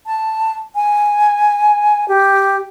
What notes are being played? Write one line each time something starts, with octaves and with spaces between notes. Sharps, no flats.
A5
G#5
G4